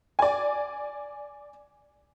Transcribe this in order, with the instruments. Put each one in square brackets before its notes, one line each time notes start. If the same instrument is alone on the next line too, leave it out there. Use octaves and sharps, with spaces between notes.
[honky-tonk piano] D5 G#5